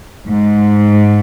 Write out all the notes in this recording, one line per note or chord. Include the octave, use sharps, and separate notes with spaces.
G#2